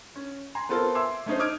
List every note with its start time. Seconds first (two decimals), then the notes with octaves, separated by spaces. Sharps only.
0.16 C#4
0.55 G#5 A#5 C6
0.69 B3 C4 F4 A4 A#4
0.95 E5 G#5 C6 D6 E6
1.26 A3 C#4 D#4 C5
1.39 D#5 D6 D#6 F6 G#6 D7